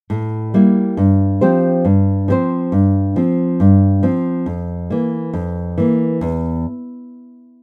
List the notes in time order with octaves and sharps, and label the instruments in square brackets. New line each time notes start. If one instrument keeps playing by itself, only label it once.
[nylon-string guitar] A2
G3 A#3 E4
G2
F3 C4 G4 C5
G2
F3 C4 G4 C5
G2
F3 C4
G2
F3 C4
F2
E3 A#3
F2
E3 A#3
E2